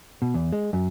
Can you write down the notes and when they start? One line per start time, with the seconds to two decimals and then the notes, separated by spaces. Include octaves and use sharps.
0.22 B2
0.34 E2
0.53 G#3
0.73 F#2